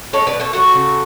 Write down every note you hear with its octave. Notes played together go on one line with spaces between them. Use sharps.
G#3 A4 C#5
B4 D5
B2
A4 C#5
F#3 F#4 A4
C#3